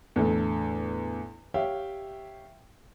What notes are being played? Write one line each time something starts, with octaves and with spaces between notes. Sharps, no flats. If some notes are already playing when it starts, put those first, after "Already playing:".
E2 A2 D3 A3
G4 C#5 E5 F5 G5